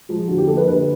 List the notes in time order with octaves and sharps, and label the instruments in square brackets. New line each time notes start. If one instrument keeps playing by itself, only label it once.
[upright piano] F3 G#3
D3 F#4
G4
F3 A#3 A4
B4
D3 B4